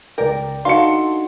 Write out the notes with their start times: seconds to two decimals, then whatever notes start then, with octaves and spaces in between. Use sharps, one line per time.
0.18 C#2 A#4 D5 G5
0.65 D4 D#4 F#4 A4 F5 C6 C#7